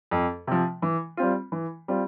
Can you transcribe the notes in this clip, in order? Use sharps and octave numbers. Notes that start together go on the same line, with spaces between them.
F2
C3 F3
E3
G3 C4 F4
E3
G3 C4 F4